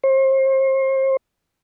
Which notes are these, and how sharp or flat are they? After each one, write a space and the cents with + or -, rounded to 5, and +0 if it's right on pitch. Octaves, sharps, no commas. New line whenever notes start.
C5 +35